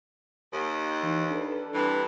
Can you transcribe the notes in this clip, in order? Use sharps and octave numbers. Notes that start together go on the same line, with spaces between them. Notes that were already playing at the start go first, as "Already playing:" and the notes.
D#2
F5 F#6 G6
E3 D#4
D4 A4 B4
G2 C3 E3